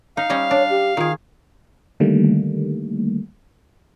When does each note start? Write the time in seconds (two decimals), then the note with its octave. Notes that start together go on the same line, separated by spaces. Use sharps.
0.17 D#4 F5
0.30 G3 C#4 D#5
0.51 D4 C#5
0.70 G4
0.97 D#3 F4 G#4
2.00 D3 D#3 G3 A3 A#3